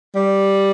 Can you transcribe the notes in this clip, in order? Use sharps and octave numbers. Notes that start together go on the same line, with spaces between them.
G3